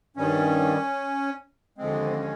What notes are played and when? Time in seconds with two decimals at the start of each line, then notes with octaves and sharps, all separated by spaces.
0.17 G2 D#3 G3 C#4
1.78 D#2 D3 F3 G#3 C4
2.10 C4
2.18 C#4